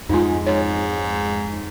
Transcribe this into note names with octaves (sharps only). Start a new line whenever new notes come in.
F2 G#2 G#3 D#4 F4
G#2 C#5